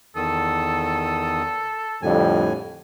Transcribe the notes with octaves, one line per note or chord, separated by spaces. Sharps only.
E2 D#3 A4 D#6
F2 A2 D3 G3 G#5